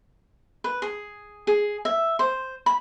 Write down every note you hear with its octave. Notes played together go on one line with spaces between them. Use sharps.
B4
G#4
G#4
E5
C5
B5